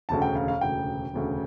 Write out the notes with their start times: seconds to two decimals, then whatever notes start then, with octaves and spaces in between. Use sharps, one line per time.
0.09 E1 D2 C#3 A5
0.22 G5
0.36 F5
0.48 F5
0.61 E1 D2 C#3 G5
1.13 E1 D2 C#3